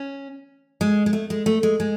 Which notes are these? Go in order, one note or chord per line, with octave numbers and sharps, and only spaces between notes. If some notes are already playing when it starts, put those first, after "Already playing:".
Already playing: C#4
G#3
G#3
A3
G#3
A3
G#3
G#3